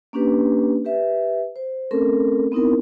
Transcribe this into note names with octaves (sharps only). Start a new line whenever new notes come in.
A#3 C#4 D4 G4 B4
G4 B4 E5
C5
A3 C4 C#4 A4 A#4
B3 C4 D#4 E4 A#4